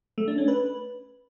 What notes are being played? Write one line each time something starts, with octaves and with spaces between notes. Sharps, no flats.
A3
D4
C#4
B4